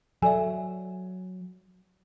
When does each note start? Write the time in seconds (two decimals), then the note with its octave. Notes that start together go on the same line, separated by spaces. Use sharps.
0.22 F#3 A4 D5 E5 G#5